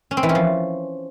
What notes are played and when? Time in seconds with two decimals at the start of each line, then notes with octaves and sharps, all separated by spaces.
0.11 C#4
0.17 C4
0.23 E3
0.29 C#4
0.35 F3